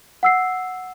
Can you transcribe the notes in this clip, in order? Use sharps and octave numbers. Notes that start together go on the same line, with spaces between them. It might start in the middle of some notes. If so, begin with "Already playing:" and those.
F#5 E6 C7